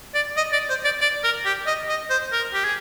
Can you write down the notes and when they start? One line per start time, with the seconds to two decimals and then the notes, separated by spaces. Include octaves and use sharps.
0.14 D5
0.37 D#5
0.53 D5
0.69 C5
0.85 D5
1.01 D5
1.24 A#4
1.46 G4
1.67 D#5
1.89 D#5
2.10 C5
2.32 A#4
2.54 G4
2.65 G#4